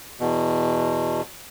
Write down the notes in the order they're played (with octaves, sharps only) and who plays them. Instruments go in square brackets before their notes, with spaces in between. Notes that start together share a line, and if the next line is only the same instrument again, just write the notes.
[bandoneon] E2 B2